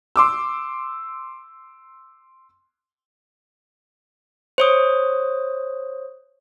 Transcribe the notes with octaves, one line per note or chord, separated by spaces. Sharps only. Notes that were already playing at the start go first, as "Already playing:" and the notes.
C6 D6 E6
C5 C#5 D#6